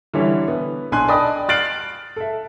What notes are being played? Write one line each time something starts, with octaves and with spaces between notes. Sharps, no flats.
D3 E3 G3 E4 C#5 E5
B3
B1 D4 G#5 C6 F#6
D5 D#5 G5 A5 B5 D#6
F6 F#6 A6 C7 D7 F#7
A4 E5